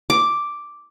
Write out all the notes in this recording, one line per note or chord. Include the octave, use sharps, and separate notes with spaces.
D6